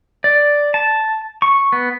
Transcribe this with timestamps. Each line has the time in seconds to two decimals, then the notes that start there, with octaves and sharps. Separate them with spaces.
0.24 D5
0.74 A5
1.42 C#6
1.72 B3